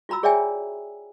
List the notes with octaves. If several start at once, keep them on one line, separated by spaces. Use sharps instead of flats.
F4 F#4 A#5 B5 E6
G#4 C#5 D5 E5 G5 G#5